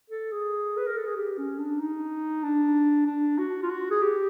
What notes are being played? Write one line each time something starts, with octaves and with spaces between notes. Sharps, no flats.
A4
G#4
B4
A#4
A4
G#4
G4
C#4
D4
D#4
D4
D4
F#4
F4
F#4
G#4
G4